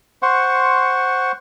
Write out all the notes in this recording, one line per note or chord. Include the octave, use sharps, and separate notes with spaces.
C5 F#5 C6 C#6